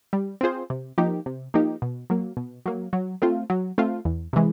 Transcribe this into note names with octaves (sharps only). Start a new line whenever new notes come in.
G3
C4 F4 G#4 C5
C3
F3 A#3 D#4 G4
C3
F3 A#3 D#4 G4
B2
F#3 A#3
B2
F#3 A#3
F#3
A3 C4 F4
F#3
A3 C4 F4
E2
C3 E3 G#3